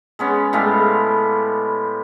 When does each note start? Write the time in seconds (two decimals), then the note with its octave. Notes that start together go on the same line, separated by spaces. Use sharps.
0.19 G#3 B3 C#4
0.53 A2 G3 G#3 F5